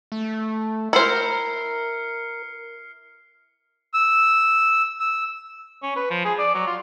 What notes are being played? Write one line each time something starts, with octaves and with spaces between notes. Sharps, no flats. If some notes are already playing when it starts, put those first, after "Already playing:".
A3
E4 A#4 C5 F6 C7 C#7
E6
E6
C#4
B4
F3
G#4
D5
F#3
F4